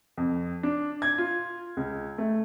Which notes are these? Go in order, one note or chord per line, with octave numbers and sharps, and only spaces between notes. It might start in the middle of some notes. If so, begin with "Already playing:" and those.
F2
D4
G#6
F4
C#2
A3